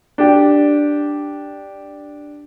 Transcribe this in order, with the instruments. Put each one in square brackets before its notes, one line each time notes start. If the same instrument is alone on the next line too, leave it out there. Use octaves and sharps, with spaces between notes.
[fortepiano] D4 G4